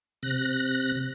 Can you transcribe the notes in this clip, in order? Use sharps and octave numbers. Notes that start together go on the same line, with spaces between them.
C3 F#6 A#6